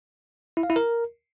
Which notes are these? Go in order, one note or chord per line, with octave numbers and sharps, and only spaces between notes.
E4
F5
E4
A#4